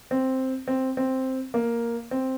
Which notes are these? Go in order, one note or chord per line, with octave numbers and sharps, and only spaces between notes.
C4
C4
C4
A#3
C4